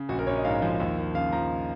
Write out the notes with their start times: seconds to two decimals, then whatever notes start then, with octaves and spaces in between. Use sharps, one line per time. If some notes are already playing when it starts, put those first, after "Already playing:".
Already playing: C#3
0.09 A#1 F#4
0.19 A#4
0.27 A#1 C#5
0.36 D#5
0.45 G#2 F5
0.62 F3
0.80 D#2
0.98 D#2
1.15 C#3 F5
1.33 F3 A#5